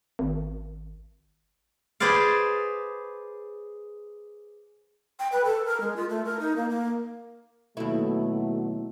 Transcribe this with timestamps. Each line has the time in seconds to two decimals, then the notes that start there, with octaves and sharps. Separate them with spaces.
0.19 G#1
2.00 G#4 B4 C5 D5 F5
5.19 G5
5.32 B4
5.45 A4
5.66 A#4
5.80 G#3
5.96 F4
6.09 A3
6.25 A#4
6.40 D#4
6.56 A#3
6.69 A#3
7.77 D#2 B2 F#3 A3 E4